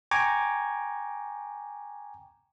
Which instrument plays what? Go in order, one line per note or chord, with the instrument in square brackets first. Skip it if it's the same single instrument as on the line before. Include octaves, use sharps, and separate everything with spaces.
[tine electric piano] G5 G#5 A#5 C#6 D6 G#6